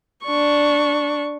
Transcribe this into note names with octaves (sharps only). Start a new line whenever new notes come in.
D4 C#6